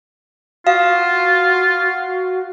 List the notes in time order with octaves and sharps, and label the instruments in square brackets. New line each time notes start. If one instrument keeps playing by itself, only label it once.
[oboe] F4 [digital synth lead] F#4 [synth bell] F5